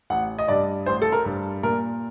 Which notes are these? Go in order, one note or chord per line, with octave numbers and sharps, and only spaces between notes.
A1 F#5
D#5
G2 D5
A1 C5
A4
A#4
G2
A#2 A#4